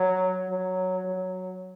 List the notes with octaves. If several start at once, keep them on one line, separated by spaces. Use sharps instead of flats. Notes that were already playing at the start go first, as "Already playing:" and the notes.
Already playing: F#3
F#3
F#3